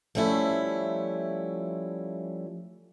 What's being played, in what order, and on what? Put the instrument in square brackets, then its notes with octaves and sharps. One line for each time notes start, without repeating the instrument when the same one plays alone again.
[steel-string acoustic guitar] F3 G3 A3 C#4 E4